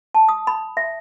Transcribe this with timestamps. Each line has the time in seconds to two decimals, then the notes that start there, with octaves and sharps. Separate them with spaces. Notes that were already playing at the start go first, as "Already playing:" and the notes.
0.15 A5
0.29 D#6
0.47 B5
0.77 E5